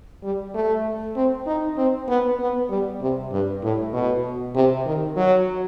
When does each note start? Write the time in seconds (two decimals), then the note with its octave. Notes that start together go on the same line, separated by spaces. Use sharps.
0.23 G3
0.54 A3
1.16 C4
1.47 D#4
1.77 C4
2.08 B3
2.40 B3
2.70 G3
3.01 C3
3.32 G2
3.63 A2
3.93 B2
4.55 C3
4.86 D#3
5.16 F#3